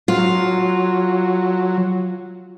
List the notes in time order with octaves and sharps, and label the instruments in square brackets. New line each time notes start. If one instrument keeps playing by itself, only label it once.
[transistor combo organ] F#3 [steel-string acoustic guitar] F4